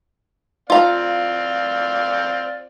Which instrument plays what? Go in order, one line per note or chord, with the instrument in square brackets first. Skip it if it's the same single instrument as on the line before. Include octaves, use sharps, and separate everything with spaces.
[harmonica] C4 D5 F5 [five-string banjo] F4 A#5